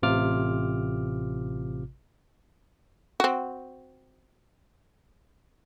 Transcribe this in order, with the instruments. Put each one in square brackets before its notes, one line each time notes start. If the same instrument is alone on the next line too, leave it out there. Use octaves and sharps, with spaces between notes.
[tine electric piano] A1 C3 F4 D6 F6
[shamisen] C4 F#4